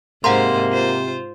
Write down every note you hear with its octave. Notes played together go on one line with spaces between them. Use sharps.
G#2 C3 A#3 C5 F#5 A#5 C6
F4 C5